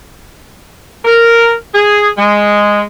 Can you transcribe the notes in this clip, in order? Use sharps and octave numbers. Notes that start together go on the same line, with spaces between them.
A#4
G#4
G#3